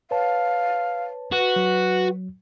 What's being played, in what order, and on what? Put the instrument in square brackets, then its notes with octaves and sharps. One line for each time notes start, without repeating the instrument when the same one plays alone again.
[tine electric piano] B4 C#5 A5 [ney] F5
[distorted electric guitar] F#4 [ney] B4
[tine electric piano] F#3